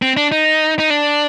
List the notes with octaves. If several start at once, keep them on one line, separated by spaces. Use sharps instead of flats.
C4
D4
D#4
D#4
D4